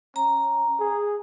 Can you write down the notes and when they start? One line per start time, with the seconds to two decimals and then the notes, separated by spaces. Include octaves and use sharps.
0.16 C#4 A#5
0.80 G#4